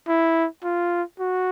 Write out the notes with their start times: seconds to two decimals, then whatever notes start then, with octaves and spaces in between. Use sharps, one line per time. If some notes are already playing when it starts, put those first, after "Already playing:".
0.08 E4
0.64 F4
1.20 F#4